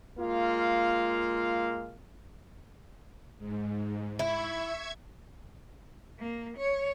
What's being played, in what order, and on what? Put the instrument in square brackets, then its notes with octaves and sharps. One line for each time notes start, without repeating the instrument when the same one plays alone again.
[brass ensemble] G#3 A#3 F4 F5
[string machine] G#2
[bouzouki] E4 [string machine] E5 C#6 G#6
[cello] A#3
C#5